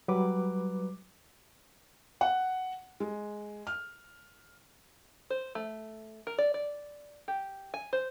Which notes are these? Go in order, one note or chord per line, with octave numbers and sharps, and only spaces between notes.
F#3 G3 B4 D6
F#5
G#3
F6
C5
A3
A#4
D5
D5
G4
G#5
C5